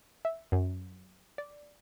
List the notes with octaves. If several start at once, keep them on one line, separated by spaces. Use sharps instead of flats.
E5
F#2
D5